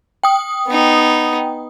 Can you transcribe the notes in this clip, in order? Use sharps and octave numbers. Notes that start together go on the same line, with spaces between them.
G5 D#6
B3 D#4